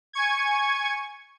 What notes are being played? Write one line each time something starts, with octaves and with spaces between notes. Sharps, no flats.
G#5 C#6 G#6